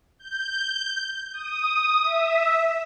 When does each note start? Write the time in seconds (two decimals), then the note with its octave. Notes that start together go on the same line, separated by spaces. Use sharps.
0.18 G6
1.32 D#6
2.01 E5